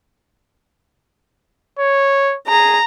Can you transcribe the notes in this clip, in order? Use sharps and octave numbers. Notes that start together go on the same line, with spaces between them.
C#5
G#4 A#5